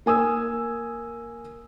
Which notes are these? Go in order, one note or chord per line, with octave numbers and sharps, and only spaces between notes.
A#3 G#5 D#6 E6